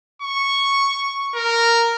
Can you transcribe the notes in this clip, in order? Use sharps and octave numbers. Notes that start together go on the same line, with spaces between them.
C#6
A#4